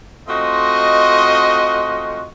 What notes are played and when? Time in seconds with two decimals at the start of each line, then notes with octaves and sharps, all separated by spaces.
0.28 A3 C4 F4 F#4 D#5